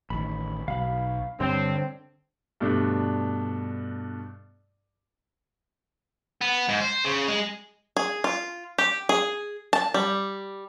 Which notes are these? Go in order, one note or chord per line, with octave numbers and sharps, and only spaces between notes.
A1 D#3 B5
B1 F5 B5
G2 D3 C4 C#5 D6
G2 B2 A3 D4
B3
G#2
C5
C#3
G#3
G#4
F4
G4
G#4
A5
G3